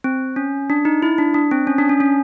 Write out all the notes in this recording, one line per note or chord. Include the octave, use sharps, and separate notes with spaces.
C4
C#4
D4
D#4
E4
D4
D4
C4
C#4
D4
C#4
C#4